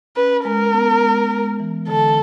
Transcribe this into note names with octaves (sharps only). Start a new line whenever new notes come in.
C#4 B4
G#3 A#4
B3
G#3
G#3
E3
D3 A4